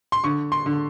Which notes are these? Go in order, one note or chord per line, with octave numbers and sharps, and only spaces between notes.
C6
D3 C#6
C6
D3